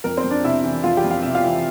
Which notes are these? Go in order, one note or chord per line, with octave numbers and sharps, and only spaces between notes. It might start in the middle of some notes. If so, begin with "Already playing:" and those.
F2 A#4
C4 C5
F2
D4 D5
C3 E4 E5
E3
F2 F4 F5
G4 G5
F2
F5
C3 E5
F4 F5
E3